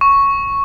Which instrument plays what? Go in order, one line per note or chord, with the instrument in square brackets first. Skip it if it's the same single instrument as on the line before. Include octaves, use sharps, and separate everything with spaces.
[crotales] C#6